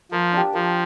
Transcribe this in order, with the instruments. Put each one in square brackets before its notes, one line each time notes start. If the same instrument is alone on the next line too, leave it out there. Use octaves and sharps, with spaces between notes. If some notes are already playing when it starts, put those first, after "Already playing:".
[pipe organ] F3 [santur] A#3
[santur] D4 G4
[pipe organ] F3 [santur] A#3